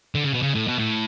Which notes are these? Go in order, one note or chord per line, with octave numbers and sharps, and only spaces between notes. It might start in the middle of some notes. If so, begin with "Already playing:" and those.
D3
C#3
B2
C#3
A2
B2
A2